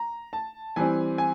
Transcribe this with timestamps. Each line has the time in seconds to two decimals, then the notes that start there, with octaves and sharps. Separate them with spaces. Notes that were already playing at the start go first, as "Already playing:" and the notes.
Already playing: A#5
0.33 A5
0.76 E3 G3 C4 G#5
1.18 G#5